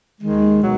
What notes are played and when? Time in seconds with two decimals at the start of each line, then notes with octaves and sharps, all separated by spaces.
0.21 D#2 D#3 G#3
0.61 B2 F#3